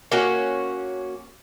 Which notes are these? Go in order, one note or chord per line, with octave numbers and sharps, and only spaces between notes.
A#3 C#4 F#4